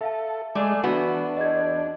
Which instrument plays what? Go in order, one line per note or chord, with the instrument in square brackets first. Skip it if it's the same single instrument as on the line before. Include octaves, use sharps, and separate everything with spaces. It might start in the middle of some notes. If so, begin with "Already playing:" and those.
[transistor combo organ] A4 [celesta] E5 F5 A5
[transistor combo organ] G#3 [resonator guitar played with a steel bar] A3 [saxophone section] G#4 D5
[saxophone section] E3 [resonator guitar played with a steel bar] B3 F#4 [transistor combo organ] D4
[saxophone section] E2 [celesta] D#5 G#6